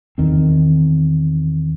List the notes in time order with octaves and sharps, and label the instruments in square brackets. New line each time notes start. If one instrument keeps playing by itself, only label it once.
[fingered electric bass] E2 D#3 C4